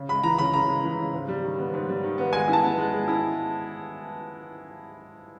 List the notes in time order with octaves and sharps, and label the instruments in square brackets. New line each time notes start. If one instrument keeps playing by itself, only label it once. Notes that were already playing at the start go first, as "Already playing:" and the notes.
Already playing: [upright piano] C#3
[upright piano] G#3 [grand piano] B5
[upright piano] E3 [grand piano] A#5
[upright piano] C#3 [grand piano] B5
[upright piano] C#3 [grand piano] A#5
[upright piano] G#3
E3
C#3
G#2
G3
D#3
B3
G#2
G3
D#3
B3
[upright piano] G#3 [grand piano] G#5
[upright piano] E4
[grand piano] A5
[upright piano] B3
G#3
G#3
E4